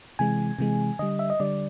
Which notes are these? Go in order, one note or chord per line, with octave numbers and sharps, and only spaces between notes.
C3 E3 G#3 G#5
C3 E3 G#3
D3 G3 D#5
E5
D#5
D3 G3 D5